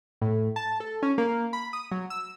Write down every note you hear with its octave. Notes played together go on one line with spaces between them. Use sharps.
A2
A5
A4
C#4
A#3
B5
D#6
F#3
E6